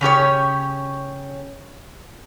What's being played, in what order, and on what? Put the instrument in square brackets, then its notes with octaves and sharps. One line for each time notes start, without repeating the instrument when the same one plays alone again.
[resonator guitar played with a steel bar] C#3 C#4 G4 C#5